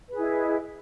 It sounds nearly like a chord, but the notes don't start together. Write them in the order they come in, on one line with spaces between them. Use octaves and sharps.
B4 G#4 E4 D#5